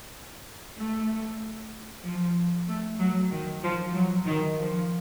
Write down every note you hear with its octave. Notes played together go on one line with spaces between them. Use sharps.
A3
F3
A3
F#3
D#3
F3
F#3
D#3
F3